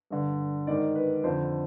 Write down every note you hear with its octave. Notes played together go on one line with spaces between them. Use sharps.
G2 D3
G#2 D#3 D5
B4
F2 D3 C5